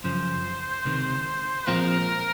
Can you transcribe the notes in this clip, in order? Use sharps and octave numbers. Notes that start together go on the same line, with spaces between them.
F#2 C#3 F3 C5
C#2 C3 D#3
A#2 F3 G#3 C4 F4 A#4